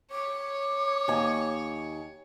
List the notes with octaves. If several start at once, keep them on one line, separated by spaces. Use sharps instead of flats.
C#5 D6
D#2 G#5